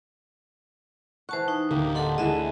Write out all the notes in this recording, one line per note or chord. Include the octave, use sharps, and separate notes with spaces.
E3 C5 F#5 A5 C#6
D#4
D1 D3 A#3 G4
D4 D#4 A4 F#5 C6
D2 D3 E3 G#3 D#5 E5